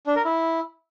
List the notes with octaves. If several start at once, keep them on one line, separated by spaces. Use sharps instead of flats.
D4
A#4
E4